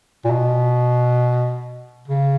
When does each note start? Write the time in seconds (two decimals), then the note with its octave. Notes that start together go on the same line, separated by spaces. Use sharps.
0.25 A#2
0.30 B2
2.08 C#3